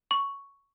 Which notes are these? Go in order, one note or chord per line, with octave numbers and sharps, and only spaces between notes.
C#6